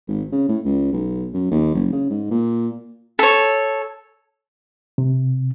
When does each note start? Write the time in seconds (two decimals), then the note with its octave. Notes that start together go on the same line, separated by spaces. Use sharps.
0.08 G#1
0.32 C#3
0.48 A2
0.65 C#2
0.93 B1
1.33 F#2
1.51 D#2
1.75 F#1
1.92 C#3
2.10 G#2
2.31 A#2
3.19 A4 C#5
4.98 C3